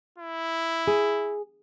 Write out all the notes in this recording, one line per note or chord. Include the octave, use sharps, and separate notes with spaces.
E4
G#4